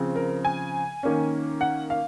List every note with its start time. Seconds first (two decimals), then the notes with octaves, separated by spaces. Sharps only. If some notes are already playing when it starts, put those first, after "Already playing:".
Already playing: C#3 F3 C4
0.16 A#4
0.45 G#5
1.03 D#3 A#3 C#4
1.61 F#5
1.90 F5